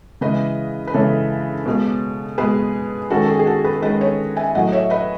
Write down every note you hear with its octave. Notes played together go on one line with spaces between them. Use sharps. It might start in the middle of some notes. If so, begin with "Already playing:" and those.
C#3 E3 G#3 B4 D#5
B4
C#3 E3 G#3 A4 C#5
B2 G#3 B3
B2 G#3 B3 G#4 B4
D#3 G#3 C#4 F#4 A4
A4
G#4
G#4
F#4 A4
G#4 B4
D#3 G#3 C#4 B4 D#5
A4 C#5
E5 G#5
A2 F#3 A3 D#5 F#5
C#5 E5
B4 D#5